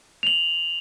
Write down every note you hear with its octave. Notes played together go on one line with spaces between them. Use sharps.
F7 F#7